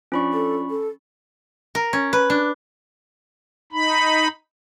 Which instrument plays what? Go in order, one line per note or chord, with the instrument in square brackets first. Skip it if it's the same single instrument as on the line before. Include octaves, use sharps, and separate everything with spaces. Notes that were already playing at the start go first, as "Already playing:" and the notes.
[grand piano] F3 D4 [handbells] C#4 B5 C#6
[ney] A4
A4
[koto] A#4
C#4
B4
D4
[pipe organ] D#4 B5